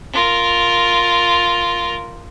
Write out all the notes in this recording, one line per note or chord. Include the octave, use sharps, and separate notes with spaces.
F4 A#4